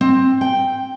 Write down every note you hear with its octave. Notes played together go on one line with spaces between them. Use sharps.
C4
G5